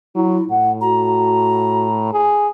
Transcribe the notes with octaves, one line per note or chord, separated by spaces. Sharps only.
F#3 E4
A2 F#5
F#4 A#5
G#4